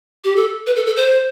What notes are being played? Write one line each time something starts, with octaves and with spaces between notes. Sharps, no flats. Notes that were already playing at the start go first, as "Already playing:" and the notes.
G4
A4
B4
A4
A4
C5